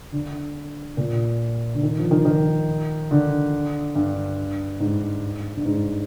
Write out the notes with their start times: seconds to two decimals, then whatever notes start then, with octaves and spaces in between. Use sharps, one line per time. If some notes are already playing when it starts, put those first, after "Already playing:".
0.12 D3
0.97 A#2
1.75 D3
1.83 D#3
1.97 F3
2.11 D#3
2.25 D#3
3.11 D3
3.95 G2
4.80 G#2
5.57 G2
5.66 G#2